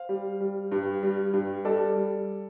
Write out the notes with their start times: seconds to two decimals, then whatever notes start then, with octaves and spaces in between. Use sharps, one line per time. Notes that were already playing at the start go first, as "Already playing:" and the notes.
Already playing: C5 F5
0.09 G3
0.40 G3
0.72 G2
1.03 G3
1.33 G2
1.65 G3 A4 D5
1.96 G3